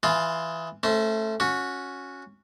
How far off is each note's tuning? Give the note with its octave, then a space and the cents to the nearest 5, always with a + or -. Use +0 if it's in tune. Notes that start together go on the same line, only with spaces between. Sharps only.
E3 +0 F4 +0 G#4 +20
A3 +0 C#4 -30 C5 +0
C#4 +0 F#4 -20 C#6 +0